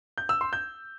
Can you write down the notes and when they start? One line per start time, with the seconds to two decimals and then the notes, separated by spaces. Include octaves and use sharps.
0.18 G6
0.29 E6
0.41 C6
0.53 G6